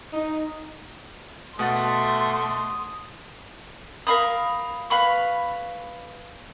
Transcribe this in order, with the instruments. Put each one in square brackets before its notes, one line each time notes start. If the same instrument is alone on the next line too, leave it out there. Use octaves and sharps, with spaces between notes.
[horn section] D#4
[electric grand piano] B2 F#5 A6 [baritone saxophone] A3 [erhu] C6 [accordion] D#6
[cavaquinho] A#4 F5 B5 D#6
B4 F5 B5 C#6